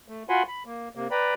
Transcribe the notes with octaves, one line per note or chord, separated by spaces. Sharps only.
A3
F4 F#4 F#5 G#5 B5 C6
B5
A#3
C3 A#3
B4 D5 G5 A#5 B5